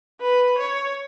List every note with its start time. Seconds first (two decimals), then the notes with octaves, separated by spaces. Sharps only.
0.21 B4
0.58 C#5